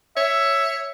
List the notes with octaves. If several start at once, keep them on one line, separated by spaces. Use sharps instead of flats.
C#5 E5